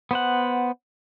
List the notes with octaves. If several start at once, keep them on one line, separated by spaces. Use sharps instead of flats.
B3 C5 F#5